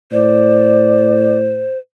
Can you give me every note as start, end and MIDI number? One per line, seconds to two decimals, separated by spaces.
0.12 1.70 45
0.12 1.78 72
0.12 1.38 74